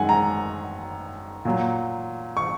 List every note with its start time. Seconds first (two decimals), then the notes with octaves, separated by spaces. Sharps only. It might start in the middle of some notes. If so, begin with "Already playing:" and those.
Already playing: F#2 D#3 G#3 F#5 G#5
0.09 A#5
1.45 A#2 F#3
2.37 C#6